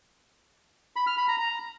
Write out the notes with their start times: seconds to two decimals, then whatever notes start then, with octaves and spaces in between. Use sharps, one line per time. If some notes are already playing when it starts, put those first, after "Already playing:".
0.96 B5
1.07 F6
1.17 B5
1.28 A#5
1.39 A#5